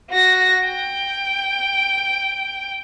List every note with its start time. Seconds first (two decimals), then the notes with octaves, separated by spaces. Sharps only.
0.11 F#4 A#6
0.66 G5